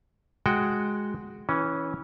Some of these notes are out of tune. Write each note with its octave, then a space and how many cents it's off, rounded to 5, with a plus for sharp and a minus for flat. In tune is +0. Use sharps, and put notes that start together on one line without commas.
G#3 +0 F#4 +0 G5 +0
E3 -20 C#4 +0